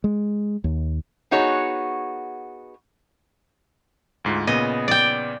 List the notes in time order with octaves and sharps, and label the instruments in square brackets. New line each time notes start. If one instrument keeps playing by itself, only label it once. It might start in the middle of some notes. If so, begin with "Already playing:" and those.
[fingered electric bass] G#3
D#2
[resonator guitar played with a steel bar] B3 D#4 F#4 G#4 C#5
[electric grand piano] D2 G#2 F4
[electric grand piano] A#2 C#3 B3 [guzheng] D#5
[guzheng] D5 G5